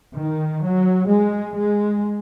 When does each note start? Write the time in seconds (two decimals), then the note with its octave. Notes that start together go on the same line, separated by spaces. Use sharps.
0.17 D#3
0.64 F#3
1.10 G#3
1.57 G#3